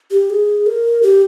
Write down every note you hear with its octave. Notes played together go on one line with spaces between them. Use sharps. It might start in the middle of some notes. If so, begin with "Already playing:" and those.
G4
G#4
A#4
G4